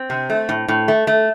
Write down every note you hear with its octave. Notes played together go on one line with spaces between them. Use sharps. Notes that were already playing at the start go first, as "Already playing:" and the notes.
Already playing: C4
C3
A3
A2
A2
A3
A3